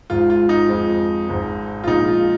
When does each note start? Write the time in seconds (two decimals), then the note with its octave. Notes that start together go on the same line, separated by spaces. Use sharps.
0.10 G#1 G#2 G#3 F4
0.30 F4
0.49 D#4
0.69 F2 F3 G#3
1.28 G#1 G#2 G#3
1.84 F4
1.87 A#1 A#2 G#3 D#4
2.07 F4